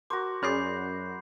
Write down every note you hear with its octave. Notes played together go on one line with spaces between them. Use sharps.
F#4 A#4 C5 D6
F#2 C#4 G#4 D5 B5 G6 C7